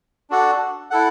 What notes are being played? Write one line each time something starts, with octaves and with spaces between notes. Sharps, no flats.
D4 F#4 A4 D5 F#5
E4 A4 F#5